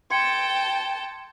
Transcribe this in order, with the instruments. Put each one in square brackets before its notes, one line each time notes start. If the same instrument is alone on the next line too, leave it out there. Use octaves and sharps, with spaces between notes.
[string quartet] G5 A5 [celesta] C6 G#6 C#7